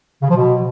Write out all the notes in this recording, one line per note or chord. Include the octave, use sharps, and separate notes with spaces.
C#3
F3
B2